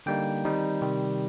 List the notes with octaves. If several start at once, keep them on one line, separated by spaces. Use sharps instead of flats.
D3 G3 A#3 D#4 G5
D#3 G3 C4 D#4
C3 D#3 G3